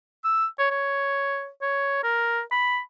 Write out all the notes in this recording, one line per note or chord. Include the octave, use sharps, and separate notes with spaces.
E6
C#5
C#5
C#5
A#4
B5